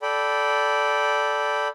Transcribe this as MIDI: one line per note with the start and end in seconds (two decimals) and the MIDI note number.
0.02 1.68 69
0.02 1.68 74
0.02 1.68 79
0.02 1.68 83